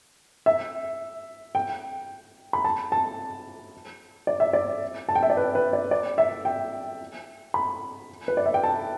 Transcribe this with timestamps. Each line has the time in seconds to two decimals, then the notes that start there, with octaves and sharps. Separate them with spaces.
0.46 E5
1.55 G5
2.53 B5
2.64 A5
2.92 A5
4.27 D5
4.40 E5
4.53 D5
5.09 A5
5.15 G5
5.23 E5
5.30 D5
5.37 B4
5.55 B4
5.73 D5
5.91 D5
6.18 E5
6.45 G5
7.54 B5
8.28 B4
8.37 D5
8.46 E5
8.54 G5
8.63 A5